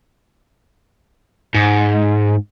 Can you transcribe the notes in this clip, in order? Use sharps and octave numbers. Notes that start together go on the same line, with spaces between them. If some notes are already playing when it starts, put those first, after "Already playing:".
G#2